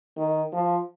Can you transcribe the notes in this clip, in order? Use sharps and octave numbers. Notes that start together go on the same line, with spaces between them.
D#3
F3